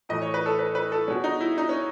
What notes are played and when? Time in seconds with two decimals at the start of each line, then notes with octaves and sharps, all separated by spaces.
0.09 A2 E3 A3 D#5
0.22 C#5
0.34 B4
0.46 A4
0.59 B4
0.75 B4
0.92 A4
1.08 B2 G#3 C#4
1.24 D#4
1.41 E4
1.58 D#4
1.69 C#4